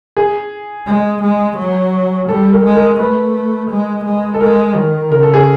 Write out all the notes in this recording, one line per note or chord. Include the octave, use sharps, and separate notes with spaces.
G#4
G#3
G#3
F#3
G3 A4
A#4
G#3
A#4
A3 B4
G#3
G#3
A4
G#3 A#4
D#3
C#3 A#4
A4
G#4